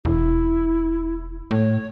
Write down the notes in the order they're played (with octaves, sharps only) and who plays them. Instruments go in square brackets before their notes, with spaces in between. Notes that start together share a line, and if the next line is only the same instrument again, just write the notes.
[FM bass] E1 [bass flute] E4
[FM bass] A2 [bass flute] C#5